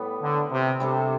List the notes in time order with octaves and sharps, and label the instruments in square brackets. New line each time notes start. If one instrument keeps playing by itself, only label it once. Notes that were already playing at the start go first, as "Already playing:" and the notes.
Already playing: [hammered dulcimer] A2 G3 B3
[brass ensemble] D3
C3
[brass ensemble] C3 [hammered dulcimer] G3 D4 A4